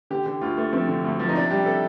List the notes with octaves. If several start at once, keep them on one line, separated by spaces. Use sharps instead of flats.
D3 G4
D3 G4
D2 F4
A3
F3 C4
D3
D2
F3
D#4
C3 D4
G3 G4
C3 A4